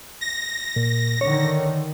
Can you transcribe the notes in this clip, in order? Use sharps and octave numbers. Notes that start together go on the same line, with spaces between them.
A#6
A#2
D3 D#3 C#5